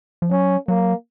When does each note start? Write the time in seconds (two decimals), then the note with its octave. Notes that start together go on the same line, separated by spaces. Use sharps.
0.22 F3
0.31 F#3 C#4
0.68 F#3 A#3